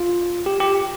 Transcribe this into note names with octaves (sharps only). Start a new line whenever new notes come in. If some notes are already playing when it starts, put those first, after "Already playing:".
Already playing: F4
G4
G4